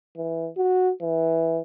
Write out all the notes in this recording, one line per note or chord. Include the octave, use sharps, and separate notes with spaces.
E3
F#4
E3